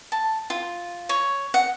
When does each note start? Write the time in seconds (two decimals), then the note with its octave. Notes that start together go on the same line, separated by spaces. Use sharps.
0.12 A5
0.50 F4
1.09 C#5
1.54 F#5